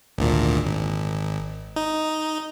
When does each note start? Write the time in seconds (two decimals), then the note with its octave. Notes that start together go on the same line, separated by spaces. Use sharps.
0.18 G#1 D2 A#2
0.65 G#1
1.76 D#4